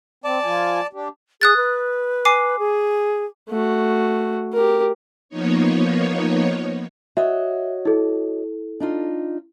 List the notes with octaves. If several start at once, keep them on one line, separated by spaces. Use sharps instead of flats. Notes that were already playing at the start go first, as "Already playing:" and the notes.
C4 D5 A5
F3 F4 G#5
D4 G4
G#4 D#6 F#6 A6
B4
G#5 D6 C7
G#4
A3 F#4
G4 A#4
F3 A#3 B3 D#4 C#5
F#4 C#5 D#5 E5
E4 A4
D4 D#4 F4